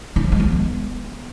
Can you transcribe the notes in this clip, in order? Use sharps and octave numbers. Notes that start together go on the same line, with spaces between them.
D4
F3
G#3
B3